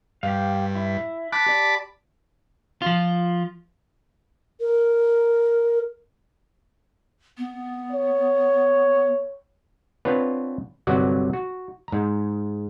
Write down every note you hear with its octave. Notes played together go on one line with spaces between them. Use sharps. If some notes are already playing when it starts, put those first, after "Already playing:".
G2 G4 F5
E4
A5 B5 D6 F#6
G4 D5
F3 F4
A#4
B3
C#5
B3 C4 D4 F4 B4 C#5
G1 C3 F#3 F#4 D5 F#5
F#4
G#2 A#5